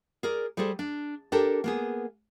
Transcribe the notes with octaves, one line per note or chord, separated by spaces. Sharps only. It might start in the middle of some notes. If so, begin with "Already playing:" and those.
G#4 A#4 D5
G3 G#4 A4 C5
D4
D4 G4 A4 A#4
A#3 B3 G#4